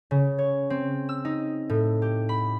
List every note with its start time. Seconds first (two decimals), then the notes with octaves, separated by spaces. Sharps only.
0.11 C#3
0.39 C#5
0.70 C4
1.09 E6
1.25 D#4
1.69 A2
2.02 G4
2.29 B5